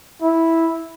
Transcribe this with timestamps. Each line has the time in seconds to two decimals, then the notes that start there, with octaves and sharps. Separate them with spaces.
0.22 E4